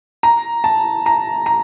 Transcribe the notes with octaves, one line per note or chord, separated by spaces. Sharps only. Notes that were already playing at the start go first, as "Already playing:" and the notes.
A#5
A5
A#5
A#5